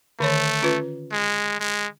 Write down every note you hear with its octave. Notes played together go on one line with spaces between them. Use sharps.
D3 D#3 A3 C#5
C#4 F4 B4
G#3
G#3